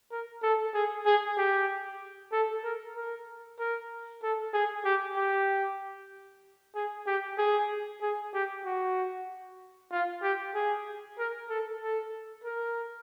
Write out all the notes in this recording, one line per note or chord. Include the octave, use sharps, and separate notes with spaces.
A#4
A4
G#4
G#4
G4
A4
A#4
A#4
A#4
A4
G#4
G4
G4
G#4
G4
G#4
G#4
G4
F#4
F4
G4
G#4
A#4
A4
A4
A#4